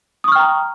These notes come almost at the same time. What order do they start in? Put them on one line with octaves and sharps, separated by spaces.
D#6 C#6 F6 G5 A#5